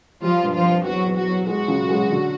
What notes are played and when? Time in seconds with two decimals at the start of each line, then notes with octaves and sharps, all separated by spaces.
0.21 F3 G3 F4
0.43 G2
0.53 F3 F4
0.63 C4
0.84 E2 F#3 F#4
1.05 E2
1.16 F#3 F#4
1.26 E2
1.46 F#3 G#3 F#4
1.68 C#3
1.88 G#3
2.10 D3